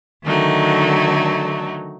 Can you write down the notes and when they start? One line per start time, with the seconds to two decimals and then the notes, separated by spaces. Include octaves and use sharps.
0.24 D3 D#3 F#3 A3 D#4